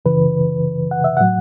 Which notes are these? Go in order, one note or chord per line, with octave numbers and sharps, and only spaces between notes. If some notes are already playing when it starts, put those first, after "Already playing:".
F#2 C#3 E3 B4
F#5
E5
A2 F#3 F#5